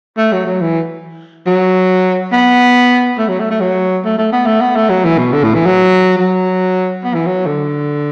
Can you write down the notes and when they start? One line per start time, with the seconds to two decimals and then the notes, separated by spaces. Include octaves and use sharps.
0.18 A3
0.32 F#3
0.46 F#3
0.61 E3
1.46 F#3
2.32 B3
3.18 A3
3.28 F#3
3.40 A3
3.51 A3
3.61 F#3
4.04 A3
4.18 A3
4.33 B3
4.46 A3
4.61 B3
4.76 A3
4.90 F#3
5.04 E3
5.18 B2
5.33 D3
5.44 A2
5.55 E3
5.65 F#3
6.18 F#3
7.04 B3
7.14 E3
7.26 F#3
7.47 D3